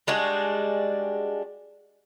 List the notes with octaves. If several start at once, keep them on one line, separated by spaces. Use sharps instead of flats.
G3 G#3 D4 F#4